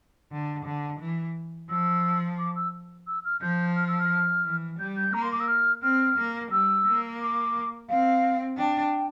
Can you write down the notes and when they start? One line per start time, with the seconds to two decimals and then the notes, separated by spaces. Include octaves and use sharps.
0.32 D3
0.66 D3
1.00 E3
1.70 F3 E6
2.39 D6
2.56 E6
3.07 E6
3.25 F6
3.41 F3 G6
3.76 F6
3.88 E6
3.99 F6
4.45 E3
4.79 G3 G6
4.96 G6
5.14 A#3 A#5
5.22 C6
5.31 D6
5.40 E6
5.48 F6
5.82 C4 F6
6.18 A#3
6.51 G3 E6
6.87 A#3
7.21 D6
7.89 C4 F5
8.58 D4 G5